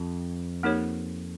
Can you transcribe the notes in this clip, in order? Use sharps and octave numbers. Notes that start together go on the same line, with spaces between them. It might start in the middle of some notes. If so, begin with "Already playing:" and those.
Already playing: F2
A#3 D#4 G4 A#4 C#5